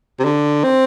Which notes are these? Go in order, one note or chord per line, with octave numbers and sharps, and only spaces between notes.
C3
D3
C4